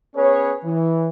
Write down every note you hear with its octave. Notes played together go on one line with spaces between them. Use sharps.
B3 C#4 G#4 B4 C#5
E3